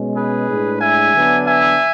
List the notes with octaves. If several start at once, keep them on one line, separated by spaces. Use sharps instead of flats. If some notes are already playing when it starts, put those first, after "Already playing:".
Already playing: B2 G#3 C#4
G#4 B4
A2 G#3 D4
E5 G#5
D3 F#3 B3 D4
E5 G#5